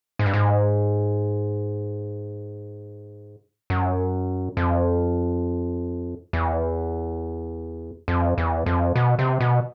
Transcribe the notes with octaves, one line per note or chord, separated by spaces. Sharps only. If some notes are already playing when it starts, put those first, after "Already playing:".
G#2
G2
G#2
F#2
F2
E2
F2
E2
F2
B2
C3
B2